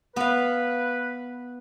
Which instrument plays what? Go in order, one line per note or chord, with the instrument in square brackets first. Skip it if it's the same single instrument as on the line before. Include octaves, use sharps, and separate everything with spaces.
[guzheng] B3 F5 [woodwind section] B4